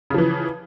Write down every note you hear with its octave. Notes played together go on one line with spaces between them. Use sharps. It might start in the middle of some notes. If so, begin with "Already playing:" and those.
C#3 E3 F3